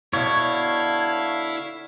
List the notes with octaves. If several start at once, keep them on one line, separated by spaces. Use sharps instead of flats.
B2 D3 E4 C#5 F5